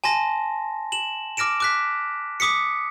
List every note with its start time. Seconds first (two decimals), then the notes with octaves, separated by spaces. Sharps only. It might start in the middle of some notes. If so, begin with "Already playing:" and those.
0.04 G#5 A5 C6 A#6
0.92 E7 F#7
1.37 D6 F6 A#6 D7 E7
1.60 D6 F#6 B6
2.40 D6 D#6 B6 C#7